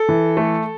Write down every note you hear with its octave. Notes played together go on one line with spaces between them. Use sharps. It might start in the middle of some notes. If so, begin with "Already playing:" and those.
Already playing: A4
E3
A3